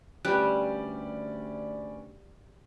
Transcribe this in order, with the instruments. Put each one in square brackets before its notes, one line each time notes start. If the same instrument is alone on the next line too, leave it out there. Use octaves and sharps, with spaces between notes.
[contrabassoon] D2 [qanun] G3 [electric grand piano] C#4 B4 D5 [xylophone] G5 F#6